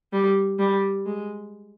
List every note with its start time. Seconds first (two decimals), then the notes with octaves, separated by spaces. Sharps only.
0.13 G3
0.59 G3
1.06 G#3